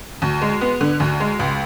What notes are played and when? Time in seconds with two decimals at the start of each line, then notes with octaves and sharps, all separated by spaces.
0.22 D2
0.42 G#3
0.61 B3
0.81 D3
1.00 D2
1.20 G#3
1.39 C#2